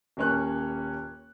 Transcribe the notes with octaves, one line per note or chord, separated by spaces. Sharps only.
D#1 A#3 C#4 C#5 F#6